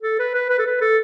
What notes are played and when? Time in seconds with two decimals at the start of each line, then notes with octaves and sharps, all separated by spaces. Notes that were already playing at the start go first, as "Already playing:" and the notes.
0.03 A4
0.19 B4
0.35 B4
0.50 B4
0.59 A4
0.66 B4
0.81 A4